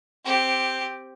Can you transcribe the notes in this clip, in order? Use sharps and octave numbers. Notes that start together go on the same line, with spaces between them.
C4 G4